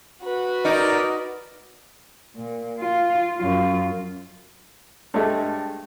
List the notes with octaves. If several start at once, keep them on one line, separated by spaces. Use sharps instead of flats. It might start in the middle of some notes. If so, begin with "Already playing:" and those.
F#4 B4
D#4 A#4 D5
A#2
F4
F#2 F4
G2 G#3 A3